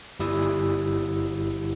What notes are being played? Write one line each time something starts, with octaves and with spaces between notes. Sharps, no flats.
G1 G3 E4 D#6 E6